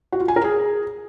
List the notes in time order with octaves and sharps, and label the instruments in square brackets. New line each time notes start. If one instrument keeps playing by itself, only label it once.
[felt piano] F#4
F4
G#5
A#4
G#4